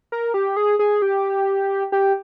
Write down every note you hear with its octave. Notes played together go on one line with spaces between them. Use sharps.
A#4
G4
G#4
G#4
G4
G4